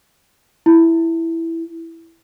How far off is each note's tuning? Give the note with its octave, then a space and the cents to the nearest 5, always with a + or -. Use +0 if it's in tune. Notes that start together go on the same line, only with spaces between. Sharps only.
E4 +0